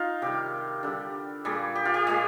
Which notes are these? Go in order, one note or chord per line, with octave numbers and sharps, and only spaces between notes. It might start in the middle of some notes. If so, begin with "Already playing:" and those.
Already playing: D#4 F4
C3 D#3 G3 G4
D3 G3
A#2 G3 G#4
G4
F4
G4
A#2 G#3 G4